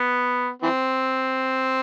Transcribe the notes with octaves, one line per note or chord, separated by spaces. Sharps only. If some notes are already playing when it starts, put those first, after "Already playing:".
Already playing: B3
E3 C4